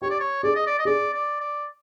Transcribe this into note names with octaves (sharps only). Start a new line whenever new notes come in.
G4 C#5
D5
C#5
G#4 D5
D#5
D5
D#5
G#4 D5
D5
D5